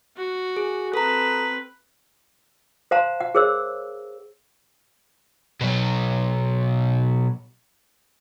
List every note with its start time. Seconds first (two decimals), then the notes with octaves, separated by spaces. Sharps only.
0.17 F#4
0.56 G#4
0.94 C4 A4 B4 A#5
2.91 C5 F5 F#5 A5 A#5 C6
3.21 F#5
3.35 G#4 A#4 C5 C#5 E6
5.61 B2 F#3